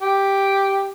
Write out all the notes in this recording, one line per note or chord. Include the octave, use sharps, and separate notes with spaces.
G4